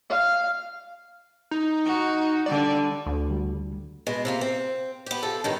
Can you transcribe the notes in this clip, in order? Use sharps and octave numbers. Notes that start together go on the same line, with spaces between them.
F5
D#4
F#4
D3 G3 D5
D2
D3 G3
B2 G#3
C3 A#3 F4
C4
B3 G4
C3 F3 A4
G2 D#3 F#3